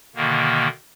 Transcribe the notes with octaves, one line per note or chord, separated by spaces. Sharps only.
B2 D3 D#3 A#3